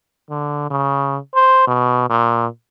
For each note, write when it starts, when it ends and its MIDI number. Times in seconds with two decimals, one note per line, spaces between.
0.30 0.66 50
0.70 1.18 49
1.35 1.63 72
1.67 2.07 47
2.10 2.47 46